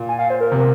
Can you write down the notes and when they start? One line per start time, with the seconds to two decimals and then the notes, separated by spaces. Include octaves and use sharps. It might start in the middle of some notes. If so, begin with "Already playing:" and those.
Already playing: A#2
0.09 G#5
0.19 F5
0.30 C5
0.40 A#4
0.51 C3